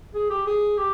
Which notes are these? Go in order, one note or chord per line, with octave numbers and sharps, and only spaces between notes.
G#4
G4
G#4
G4